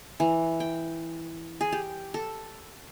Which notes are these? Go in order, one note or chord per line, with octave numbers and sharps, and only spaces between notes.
E3
G5
G#4
G4
A4